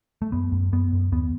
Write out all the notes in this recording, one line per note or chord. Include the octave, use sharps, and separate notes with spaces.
A3
F#2 B3
F#2
F#2 B3
F#2
D#2 B3